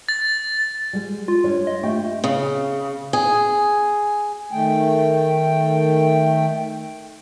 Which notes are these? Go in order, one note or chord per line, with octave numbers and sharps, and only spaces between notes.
A6
G3 G#3
F4
G3 D4 C#5
D#5
A3 F4 G4 G5
C#3
G#4
D#3 A3 G5